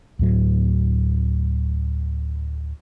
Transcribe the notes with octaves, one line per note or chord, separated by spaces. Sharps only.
D2 A2 F#3